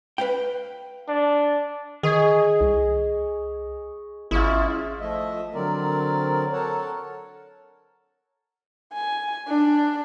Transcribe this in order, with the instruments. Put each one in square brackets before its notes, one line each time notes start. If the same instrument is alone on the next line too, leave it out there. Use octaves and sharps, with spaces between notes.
[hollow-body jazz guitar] B4 F5 G5
[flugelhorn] D4
[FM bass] D#3 [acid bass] G#4 [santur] C#5 D#5
[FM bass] C2
[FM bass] G#1 [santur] G#3 C#4 F4 [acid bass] E4
[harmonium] F3 A3 D#5 E5
D3 F#3 C4 A#4 D5
A4 A#4 C#5 F#5 A5
[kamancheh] G#5
D4